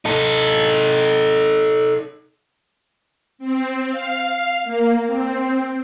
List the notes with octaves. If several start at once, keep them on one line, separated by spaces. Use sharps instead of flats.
D#4 A4
C4
F5
A#3
C4